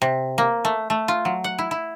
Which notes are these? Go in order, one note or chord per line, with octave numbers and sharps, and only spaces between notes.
C3
A#3
A3
A3
F4
F#3
F#5
E4
E4